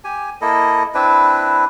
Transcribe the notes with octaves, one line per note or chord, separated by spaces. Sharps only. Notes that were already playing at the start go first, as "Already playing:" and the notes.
G4 G#5
A#3 E4 A4 D#5
C4 D4 E4 B4